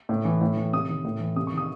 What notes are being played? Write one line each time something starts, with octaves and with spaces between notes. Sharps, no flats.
A2
E3
A2
E3
C3 D#6
D#3
A2
E3
C3 D#6
C#6
D#3 D#6